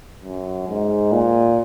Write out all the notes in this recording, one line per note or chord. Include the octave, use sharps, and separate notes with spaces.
F#2
G#2
A#2